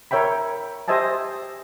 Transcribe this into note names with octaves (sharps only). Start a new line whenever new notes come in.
A#4 C#5 E5 G5 B5
G4 C5 D#5 E5 G#5 A5